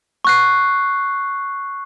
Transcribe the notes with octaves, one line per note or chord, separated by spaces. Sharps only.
C#6 F#6 C7